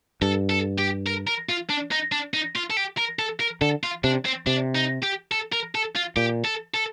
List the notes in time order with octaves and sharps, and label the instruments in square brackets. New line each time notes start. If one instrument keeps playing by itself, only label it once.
[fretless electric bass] G2 [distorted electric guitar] A4
[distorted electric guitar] A4
G4
A#4
A#4
F4
D4
D#4
D4
D#4
F4
A4
G4
A#4
A4
A#4
[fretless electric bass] D3 [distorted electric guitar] A4
[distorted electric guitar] F4
[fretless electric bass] C3 [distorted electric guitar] D4
[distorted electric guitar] C4
[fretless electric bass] C3 [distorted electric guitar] D4
[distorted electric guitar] D#4
G4
A4
A#4
A4
F4
[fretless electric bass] A#2 [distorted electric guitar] G4
[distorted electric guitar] A4
A4